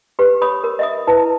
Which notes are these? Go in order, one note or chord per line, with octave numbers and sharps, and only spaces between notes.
G4 B4
C#5 B5 D#6
A#4
D#5 E5 D#6
E4 B4 A5